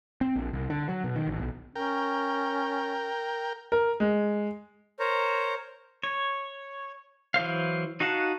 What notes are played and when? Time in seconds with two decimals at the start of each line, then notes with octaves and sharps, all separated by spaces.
0.21 C4
0.36 A#1
0.53 C2
0.70 D3
0.89 F#3
1.04 B2
1.16 D#3
1.27 A1
1.39 B1
1.75 C#4 A#4 G5
3.72 A#4
4.00 G#3
4.99 A#4 C5 C#5 A#5
6.03 C#5
7.34 E3 F#3 C5 F5
8.00 D#4 F#4 F5 F#5 A5